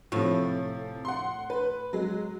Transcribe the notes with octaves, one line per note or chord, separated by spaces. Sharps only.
A2 C3 F3
F#5 C6
B4
F#3 G#3